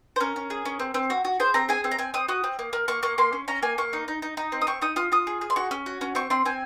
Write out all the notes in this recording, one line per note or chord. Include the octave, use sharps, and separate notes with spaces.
C5
C#4 A#4
C#4
G#4
C#4
C4
C4
F#4
F#4
G#4 C5
C4 A#5
G#4 G#5
C4
A#5
C4 G#5
C4 D#6
F#4 D#6
C4
A#3
A#3
A#3 C#6
A#3 C#6
A#3 C6
C#4
C#4 A#5
A#3 G#5
A#3 C#6
D#4
D#4
D#4
D#4
C4
D#6
C4 C#6
D#4 D#6
F4 D#6
F4 D#6
G#4
G#4
C6
F#4 C#6
C#4
F#4
C#4
C4 C#6
C4 C6
C4 G#5